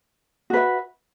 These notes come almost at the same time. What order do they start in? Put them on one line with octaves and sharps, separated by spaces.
F#4 B4 E5